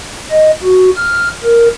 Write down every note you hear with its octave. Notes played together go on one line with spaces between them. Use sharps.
D#5
F#4
F6
A#4